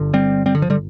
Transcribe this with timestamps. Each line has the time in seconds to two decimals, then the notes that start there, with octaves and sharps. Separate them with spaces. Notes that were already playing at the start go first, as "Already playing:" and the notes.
Already playing: G1 D3
0.14 G3 C4
0.46 G3 C4
0.55 D3
0.62 F3
0.70 D3 G3